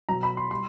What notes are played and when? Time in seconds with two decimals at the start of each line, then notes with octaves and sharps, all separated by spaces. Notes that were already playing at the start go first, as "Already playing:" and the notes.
0.09 B2 F#3 A#5
0.23 B5
0.37 C6
0.51 G3 C6